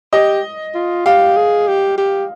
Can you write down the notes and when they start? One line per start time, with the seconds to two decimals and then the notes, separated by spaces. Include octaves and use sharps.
0.13 G4 D#5
0.74 F4
1.06 G4 F5
1.37 G#4
1.68 G4
1.97 G4